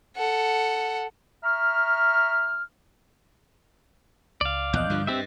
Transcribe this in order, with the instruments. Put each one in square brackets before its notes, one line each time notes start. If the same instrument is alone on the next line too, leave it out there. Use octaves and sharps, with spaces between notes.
[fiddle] A4 F#5
[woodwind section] E5 A#5 C#6 F6
[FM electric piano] C#2 [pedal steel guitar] D5 F5
[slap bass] A#1 E2 [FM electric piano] D#5 F#6 G6
[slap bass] G2 D3 F3
[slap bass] G2 [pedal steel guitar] C4 G4 E5